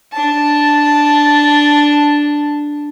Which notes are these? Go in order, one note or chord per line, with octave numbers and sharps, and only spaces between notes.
D4 A5